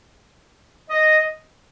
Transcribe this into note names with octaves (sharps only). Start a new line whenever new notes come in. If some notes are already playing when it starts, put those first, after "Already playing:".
D#5